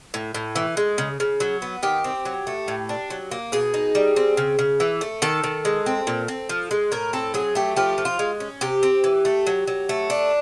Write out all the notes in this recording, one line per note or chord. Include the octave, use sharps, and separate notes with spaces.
A2
A2
E3
G#3
C#3
C#3
F#3
B3
D#3 G4
C4
F#3
A3
A2
D4
F#3
A#3
B2 G#4
D#4
G3
C4
C#3
C#3
E3
A3
D#3 A4
D#3
G#3
C4
A#2
C4
F3
G#3
A2 A#4
C4 A4
F#3 G#4
A3 G4
F3 G4
F3
F4
G#3
C#4
C3 G4
C4
E3
A3
F#3
F#3
A3
D4